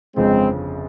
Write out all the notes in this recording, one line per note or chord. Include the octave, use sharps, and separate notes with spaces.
G1 F2 C#3 F3 G#3 C4